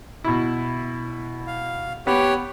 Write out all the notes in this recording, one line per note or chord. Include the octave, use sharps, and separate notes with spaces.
B2 E4
F5
B3 G4 C#5